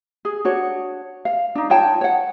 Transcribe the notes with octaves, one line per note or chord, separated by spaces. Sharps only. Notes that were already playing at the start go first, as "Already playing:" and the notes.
G#4
D4 F#4 C#5
F5
D4 D#4
F4 C#5 G5 A5
C#5 F#5